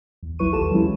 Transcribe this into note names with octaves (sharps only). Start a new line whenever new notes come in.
E2
A#1 F#3 E4 B4 C#6 D#7
D#2 F4 G4 A4 A5 E7
E3 F#3 G#3 C#4 E4